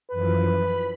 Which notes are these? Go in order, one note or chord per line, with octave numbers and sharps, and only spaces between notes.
F#2 E3 F3 B4
B5